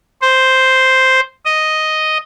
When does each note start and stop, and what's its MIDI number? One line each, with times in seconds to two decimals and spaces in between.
0.22 1.20 72
1.45 2.18 75